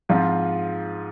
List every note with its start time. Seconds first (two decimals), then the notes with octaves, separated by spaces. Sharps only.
0.09 G#2 F3 C4 F4